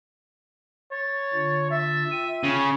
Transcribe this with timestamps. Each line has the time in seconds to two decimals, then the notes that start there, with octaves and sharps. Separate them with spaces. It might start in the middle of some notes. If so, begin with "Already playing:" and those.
0.92 C#5 A6
1.33 D3 D4 F4
1.70 E5 A6
2.11 F4 G5 D#7
2.44 C#3